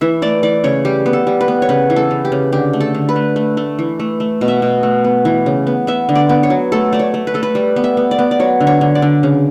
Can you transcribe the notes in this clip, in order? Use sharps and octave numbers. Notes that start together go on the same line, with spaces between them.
E3 E5
A3 D5
E3 D5
C#3 C#5
G3 G4
B3
A4
G3
B4
B3
C#5
C#3 B4
E3
A4
C#3
G4
C#3
D3 G4
A3
A4
D3
B4
A3
A3
A3
E3
A3
A3
B2
E5
B2
A3
B3
E3
C#3
B3
B3 E5
D3
D5
B3
C#5
F#3
A3 A4
A3 D5
C#5
A3
B4
A3 A4
B4
G3
B3
E5
B3
D5
B3
D5
F#3 C#5
D3
C#5
D3
D5
D3
C#3